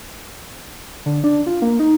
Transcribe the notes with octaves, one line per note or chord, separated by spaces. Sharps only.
D3
D4
F4
A#3
D#4